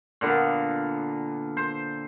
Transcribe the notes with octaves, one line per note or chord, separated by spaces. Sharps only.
A#2 D3 B3
C5